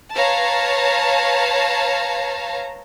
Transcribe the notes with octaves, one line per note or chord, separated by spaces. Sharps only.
B4 C#5 F5 A5 A#5